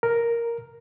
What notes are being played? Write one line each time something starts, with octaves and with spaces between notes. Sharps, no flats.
A#4